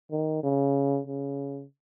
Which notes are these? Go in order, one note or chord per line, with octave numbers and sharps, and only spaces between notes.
D#3
C#3
C#3